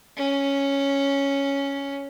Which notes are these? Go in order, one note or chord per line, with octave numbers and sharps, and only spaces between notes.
C#4